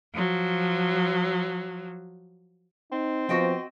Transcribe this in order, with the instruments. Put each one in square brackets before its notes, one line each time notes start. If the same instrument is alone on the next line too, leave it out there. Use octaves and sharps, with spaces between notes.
[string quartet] F3 F#3
[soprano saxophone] C4 [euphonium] D#4
[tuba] F3 [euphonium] B3 [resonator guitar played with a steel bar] F#4 D#5 G5